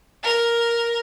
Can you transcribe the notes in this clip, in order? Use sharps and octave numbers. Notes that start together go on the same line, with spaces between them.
A#4